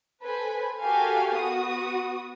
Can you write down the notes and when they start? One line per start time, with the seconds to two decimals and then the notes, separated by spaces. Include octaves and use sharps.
0.23 A4 B4 C5 G#5
0.81 F#4 G4 A4 A#4 F5 G#5
1.35 B3 F#4 D#6